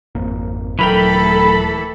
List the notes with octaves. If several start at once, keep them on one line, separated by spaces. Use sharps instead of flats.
G#1 F2 A#3
D#1 E3 F#3 A3 A4 A#4 G5 B5